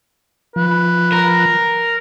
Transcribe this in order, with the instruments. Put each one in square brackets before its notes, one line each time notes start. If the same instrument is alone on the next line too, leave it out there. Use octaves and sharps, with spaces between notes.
[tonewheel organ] F3 [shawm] B4
[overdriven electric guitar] A#4